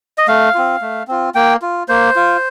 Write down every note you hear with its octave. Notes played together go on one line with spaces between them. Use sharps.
D#5
A3 F5
C4 F4
A3
C4 F4
A#3 G5
F4
A#3 C5
F4